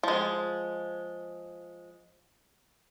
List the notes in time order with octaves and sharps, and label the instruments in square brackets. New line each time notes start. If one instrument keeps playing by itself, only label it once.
[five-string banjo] F3 G#3